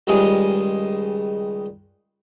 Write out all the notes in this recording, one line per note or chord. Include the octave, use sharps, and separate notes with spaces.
C#2 D#3 G3 G#3 G#5